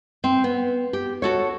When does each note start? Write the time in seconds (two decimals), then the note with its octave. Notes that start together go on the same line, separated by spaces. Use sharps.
0.24 C4
0.44 B3
0.93 G4
1.22 F#4 A4 C#5